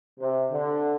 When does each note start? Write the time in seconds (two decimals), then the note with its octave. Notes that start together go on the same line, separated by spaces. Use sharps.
0.20 C3
0.51 D3